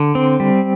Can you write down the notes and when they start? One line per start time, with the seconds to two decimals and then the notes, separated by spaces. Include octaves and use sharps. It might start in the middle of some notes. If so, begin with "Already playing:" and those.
Already playing: D3
0.15 C4
0.40 G3